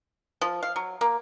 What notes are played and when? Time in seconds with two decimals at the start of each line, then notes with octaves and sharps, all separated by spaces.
0.41 F3
0.63 F5
0.76 F#3
1.01 A#3